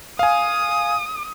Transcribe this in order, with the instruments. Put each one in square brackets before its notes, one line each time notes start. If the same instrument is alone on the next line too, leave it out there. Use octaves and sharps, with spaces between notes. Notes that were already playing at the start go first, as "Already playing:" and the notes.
[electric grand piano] F5 G#5 [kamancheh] D#6